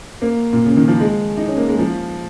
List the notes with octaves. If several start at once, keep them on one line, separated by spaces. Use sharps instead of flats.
A#3
A#2
C#3
D#3
F3
G#3
D#4
C#4
A#3
G#3
F3